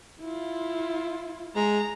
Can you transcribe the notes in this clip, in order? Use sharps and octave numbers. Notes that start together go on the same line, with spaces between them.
E4 F4
G#3 A#5